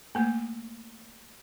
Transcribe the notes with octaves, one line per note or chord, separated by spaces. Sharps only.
A3 A#3